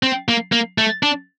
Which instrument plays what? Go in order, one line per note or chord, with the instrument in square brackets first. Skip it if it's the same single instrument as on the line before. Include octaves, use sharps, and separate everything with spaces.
[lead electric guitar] C4
A#3
A#3
A3
D4